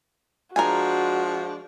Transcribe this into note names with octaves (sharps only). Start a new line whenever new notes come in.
F3 G#3 D4 F#4 A#4 G#5